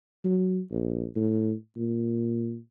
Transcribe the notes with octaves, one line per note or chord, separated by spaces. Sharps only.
F#3
A#1
A2
A#2